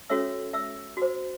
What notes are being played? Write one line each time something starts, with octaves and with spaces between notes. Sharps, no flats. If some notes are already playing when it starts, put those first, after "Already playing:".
C#4 F#4 A4 C#5 E5 E6
E5 E6
F#4 C5